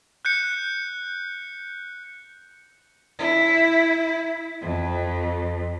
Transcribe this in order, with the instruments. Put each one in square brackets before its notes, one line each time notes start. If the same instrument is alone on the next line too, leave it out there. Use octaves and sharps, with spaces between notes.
[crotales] F#6 G6 C#7
[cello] E4
F2